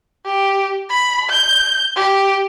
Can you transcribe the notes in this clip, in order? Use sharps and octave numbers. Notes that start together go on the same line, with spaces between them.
G4
B5
G6
G4